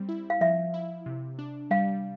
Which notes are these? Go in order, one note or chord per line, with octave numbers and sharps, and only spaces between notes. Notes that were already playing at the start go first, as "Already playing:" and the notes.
Already playing: G3 C4
E4
F5
F3 E5
E4
C3
D4
G3 F5